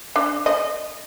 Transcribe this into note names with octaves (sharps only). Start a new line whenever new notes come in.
D4
D#5